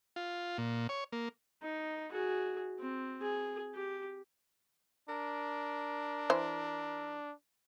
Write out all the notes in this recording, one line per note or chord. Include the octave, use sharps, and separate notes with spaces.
F4
A#2
C#5
A#3
D#4
F#4 G#4
C4
G#4
G4
D4 A#4
E3 C5